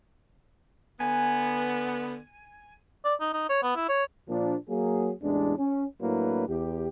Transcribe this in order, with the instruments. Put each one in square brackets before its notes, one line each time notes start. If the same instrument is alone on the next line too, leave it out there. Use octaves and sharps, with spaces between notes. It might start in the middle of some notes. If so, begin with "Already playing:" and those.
[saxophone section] D3 B3 [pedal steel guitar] G#5
[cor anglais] D5
D#4
D#4
C#5
B3
E4
C#5
[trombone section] A#2 F3 D4
F#3 A#3 G#4
A1 E2 G#3 D4
C#4
A2 F#3 A#3 D4 E4 B4
E2 G4